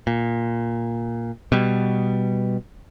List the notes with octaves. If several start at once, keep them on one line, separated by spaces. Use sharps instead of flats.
A#2
B2 G3